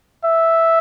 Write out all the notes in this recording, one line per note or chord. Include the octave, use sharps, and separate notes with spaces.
E5